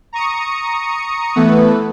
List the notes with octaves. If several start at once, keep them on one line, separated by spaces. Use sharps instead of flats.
A#5 C#6 D#6 C#7
E3 A3 B3 B4